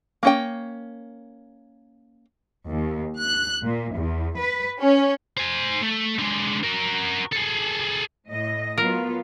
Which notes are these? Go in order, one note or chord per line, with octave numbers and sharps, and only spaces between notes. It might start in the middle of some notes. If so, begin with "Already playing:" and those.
A#3 C#4 G5
D#2
F#6
A#2
E2
B4
C#4
C5 G#5
A3
D3 G#3
F#4 A#4
G#4 A4
A2 D#5
F#3 B3 F4 A#4